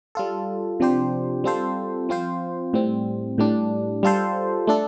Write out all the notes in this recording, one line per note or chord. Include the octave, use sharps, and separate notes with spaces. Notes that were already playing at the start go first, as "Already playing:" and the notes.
G3 F4 A4
C3 F3 D4 G4 C5
G3 C4 F4 A4 C5
F3 C4 F4 C5
A2 G3 C4
A2 G3 D4
G3 F4 A4 C5
A3 D4 A4